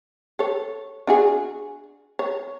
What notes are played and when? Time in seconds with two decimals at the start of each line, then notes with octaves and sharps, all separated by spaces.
0.39 A4 C#5
1.07 D4 F#4 G#4
2.19 C#5